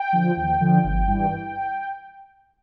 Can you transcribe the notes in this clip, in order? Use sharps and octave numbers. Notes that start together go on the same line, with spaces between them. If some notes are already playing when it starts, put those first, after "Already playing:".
Already playing: G5
D3 F3
D#2
D3 F3
G1
G2 E3